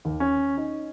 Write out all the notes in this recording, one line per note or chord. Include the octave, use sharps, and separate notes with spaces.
D#2
C#4
D#4